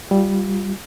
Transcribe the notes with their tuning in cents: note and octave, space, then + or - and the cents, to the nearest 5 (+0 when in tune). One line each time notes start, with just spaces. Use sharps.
G3 +0 F4 +20